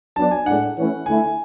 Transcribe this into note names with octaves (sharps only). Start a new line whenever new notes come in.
F#3 B3 D4 A5
G#5
A2 G#3 D4 F#5
E3 A3 C#4 E4
D3 A3 E4 G#5